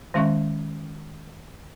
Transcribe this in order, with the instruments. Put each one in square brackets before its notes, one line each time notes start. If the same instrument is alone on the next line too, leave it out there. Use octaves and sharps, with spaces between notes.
[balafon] D#3 G#3 C#4 E5 C#6